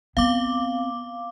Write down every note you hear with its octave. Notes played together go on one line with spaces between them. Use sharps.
B3 C4 F5 D6